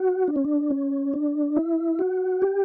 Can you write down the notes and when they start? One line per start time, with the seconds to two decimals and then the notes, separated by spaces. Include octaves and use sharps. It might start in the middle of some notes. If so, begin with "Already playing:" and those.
Already playing: F#4
0.28 D4
0.36 C#4
0.45 D4
0.71 C#4
1.14 D4
1.56 E4
1.99 F#4
2.42 G4